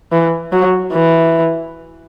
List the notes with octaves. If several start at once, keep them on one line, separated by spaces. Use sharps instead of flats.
E3
F#3
E3